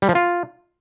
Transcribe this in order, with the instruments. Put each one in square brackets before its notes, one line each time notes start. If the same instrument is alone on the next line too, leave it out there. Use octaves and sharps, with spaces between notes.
[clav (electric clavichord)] G3
F3
F4